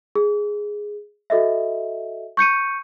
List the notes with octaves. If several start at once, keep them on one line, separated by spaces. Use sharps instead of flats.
G#4
F#4 A4 D#5 E5
C#6 G6 C#7 D#7